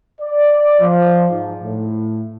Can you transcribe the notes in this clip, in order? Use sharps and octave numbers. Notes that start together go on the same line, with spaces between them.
D5
F3
G#2
A2